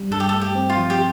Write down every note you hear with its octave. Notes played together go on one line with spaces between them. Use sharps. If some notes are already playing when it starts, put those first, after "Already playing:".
Already playing: G3
G2 A4
G4
A4
A3
G4
C4
F4
F3
G4